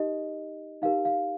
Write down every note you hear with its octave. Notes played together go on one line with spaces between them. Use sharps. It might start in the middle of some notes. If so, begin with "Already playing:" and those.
Already playing: D#4 G4 A#4 D#5
D#4 G4 A#4 F5
F5